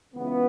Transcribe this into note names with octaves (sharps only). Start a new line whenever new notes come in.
C#2 C#3 E3 B3